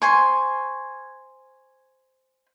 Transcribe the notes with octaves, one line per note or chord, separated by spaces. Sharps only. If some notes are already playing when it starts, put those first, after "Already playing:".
C5 G#5 C#6